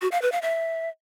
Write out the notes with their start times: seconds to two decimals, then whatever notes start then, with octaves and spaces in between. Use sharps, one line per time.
0.02 F#4
0.12 F5
0.22 B4
0.32 F5
0.42 E5